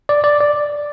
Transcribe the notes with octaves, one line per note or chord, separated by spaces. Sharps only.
D5
D5
D5